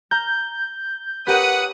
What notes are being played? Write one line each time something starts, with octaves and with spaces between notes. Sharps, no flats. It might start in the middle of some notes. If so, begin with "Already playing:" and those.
A#5 F6 G6
C#4 G4 A#4 B4 F#5 D#6